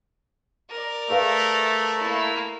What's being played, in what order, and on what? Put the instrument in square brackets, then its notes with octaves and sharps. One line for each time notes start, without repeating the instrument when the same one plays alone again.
[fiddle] A#4 D5
[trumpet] A3 [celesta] G#4 B4 F5
[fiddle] A#3 E4